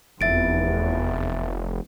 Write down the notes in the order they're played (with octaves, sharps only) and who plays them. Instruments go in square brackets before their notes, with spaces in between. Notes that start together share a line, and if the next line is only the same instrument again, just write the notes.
[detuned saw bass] F1 [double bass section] E2 [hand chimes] E5 A6 D7